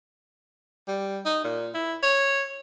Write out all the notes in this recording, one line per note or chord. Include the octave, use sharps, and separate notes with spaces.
G3
D#4
A#2
E4
C#5